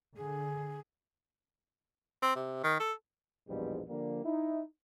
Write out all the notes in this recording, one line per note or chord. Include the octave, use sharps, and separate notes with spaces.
D3 G#4
C4
C3
D#3
A4
A#1 E2 G#2 B2 F3 G3
D3 F3 G3 A#3
D#4 E4